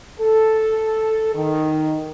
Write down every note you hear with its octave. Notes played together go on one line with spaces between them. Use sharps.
A4
D#3